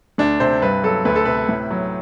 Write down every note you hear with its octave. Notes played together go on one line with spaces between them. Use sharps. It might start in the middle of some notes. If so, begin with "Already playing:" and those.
D2 D4
C3 C5
G2 B4
F#3 A4
D2 B4
A4
C3 B4
A2
F#3